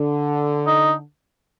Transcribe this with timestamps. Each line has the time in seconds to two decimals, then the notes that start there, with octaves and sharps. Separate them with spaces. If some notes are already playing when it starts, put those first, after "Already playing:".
Already playing: D3
0.67 D#4